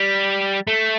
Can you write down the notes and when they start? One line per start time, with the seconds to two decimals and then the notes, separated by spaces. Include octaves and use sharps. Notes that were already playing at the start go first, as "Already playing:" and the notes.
Already playing: G3
0.67 A3